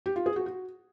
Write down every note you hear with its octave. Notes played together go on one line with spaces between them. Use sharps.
G4
F4
G#4
F#4
F#4